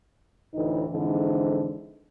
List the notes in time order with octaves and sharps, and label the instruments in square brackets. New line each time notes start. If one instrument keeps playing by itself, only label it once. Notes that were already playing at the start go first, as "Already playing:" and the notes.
[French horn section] D2 A2 E3 D#4
F2 G#2 D3 E3